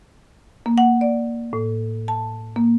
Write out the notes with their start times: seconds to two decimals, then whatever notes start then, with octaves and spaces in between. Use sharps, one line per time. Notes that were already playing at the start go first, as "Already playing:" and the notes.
0.66 A#3
0.78 F#5
1.01 D5
1.53 A2
2.08 A5
2.56 A#3